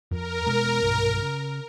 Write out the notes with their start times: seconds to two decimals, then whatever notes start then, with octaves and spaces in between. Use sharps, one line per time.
0.11 F2 A#4
0.46 B2 G#3 B3
0.83 B1 G2 A#2
1.22 C#3